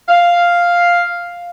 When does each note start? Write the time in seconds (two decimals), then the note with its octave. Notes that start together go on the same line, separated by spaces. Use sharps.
0.09 F5